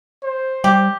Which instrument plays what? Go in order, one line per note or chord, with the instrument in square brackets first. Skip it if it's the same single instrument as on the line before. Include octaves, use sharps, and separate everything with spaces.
[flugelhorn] C5
[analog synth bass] G3 [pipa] G4